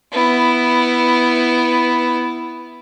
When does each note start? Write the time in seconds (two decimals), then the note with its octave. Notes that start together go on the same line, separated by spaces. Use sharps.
0.12 B3 E4